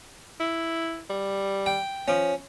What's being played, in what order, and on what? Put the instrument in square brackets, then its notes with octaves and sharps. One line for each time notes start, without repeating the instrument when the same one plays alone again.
[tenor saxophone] E4
G3
[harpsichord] G5
[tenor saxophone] F3 [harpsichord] C#4